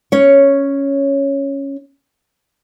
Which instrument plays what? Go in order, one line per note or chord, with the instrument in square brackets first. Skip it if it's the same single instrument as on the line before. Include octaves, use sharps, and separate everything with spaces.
[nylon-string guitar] C#4 C#5